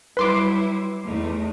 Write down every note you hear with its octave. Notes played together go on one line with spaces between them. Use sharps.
F#3 G3 E4 B4 C6 D6
E2 A3 D#4